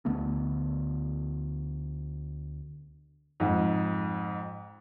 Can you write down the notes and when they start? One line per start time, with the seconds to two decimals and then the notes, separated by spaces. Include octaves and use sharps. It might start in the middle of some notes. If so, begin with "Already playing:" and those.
0.05 D2 D3 A3 B3
3.40 F2 G#2